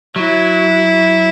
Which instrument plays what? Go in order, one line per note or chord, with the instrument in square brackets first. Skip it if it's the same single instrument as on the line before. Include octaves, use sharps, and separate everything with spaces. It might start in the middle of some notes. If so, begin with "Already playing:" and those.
[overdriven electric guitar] F#3 [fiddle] E4